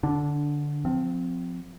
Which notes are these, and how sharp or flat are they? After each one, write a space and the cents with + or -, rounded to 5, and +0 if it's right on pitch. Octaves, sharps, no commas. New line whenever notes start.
D3 +0 D4 -15
F3 +20 C4 -20